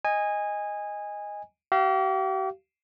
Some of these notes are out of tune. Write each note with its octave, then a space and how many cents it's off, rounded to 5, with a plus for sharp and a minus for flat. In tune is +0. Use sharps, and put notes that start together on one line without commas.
D#5 +0 G#5 -15
G4 -45 F5 -25